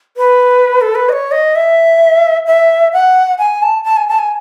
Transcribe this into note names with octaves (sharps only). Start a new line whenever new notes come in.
B4
A4
B4
D#5
C#5
D#5
E5
E5
F#5
G#5
A5
A5
G#5
A5
G#5